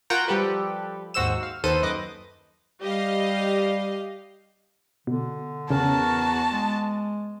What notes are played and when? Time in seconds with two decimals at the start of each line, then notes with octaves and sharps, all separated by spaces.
0.10 F4 F#4 A#4 F#5 G5 A#5
0.28 F3 G3 G4 A4 B4
1.14 D#2 G#2 F#4 C5 E6 E7
1.43 F5
1.64 D#2 D#3 A4 B4 C5 D#7
1.82 F#2 B4 D#5 D6
2.82 G3 G4 D#5 F5
5.07 B2 D3
5.70 E2 C#3 C#4 F#4 A#4 A5
6.53 G#3